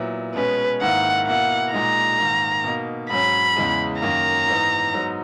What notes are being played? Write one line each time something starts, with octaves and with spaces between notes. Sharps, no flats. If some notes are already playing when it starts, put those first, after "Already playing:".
Already playing: A#2 F#3 B3 E4
B2 G#3 C#4 B4
G#2 D#3 A#3 E4 F#5
B2 A#3 E4 F#5
A#2 G#3 D#4 A#5
G#2 D#3 A#3
B2 A#3 D#4
G#2 F#3 C#4 B5
E2 C#3 E3 G#3
F#2 D#3 A#3 A#5
G#2 E3 B3 D#4
G#2 F#3 B3 D#4